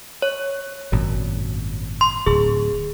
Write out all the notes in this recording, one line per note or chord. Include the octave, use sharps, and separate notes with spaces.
C#5
G#1 F#2 A#2
C6
D1 G#4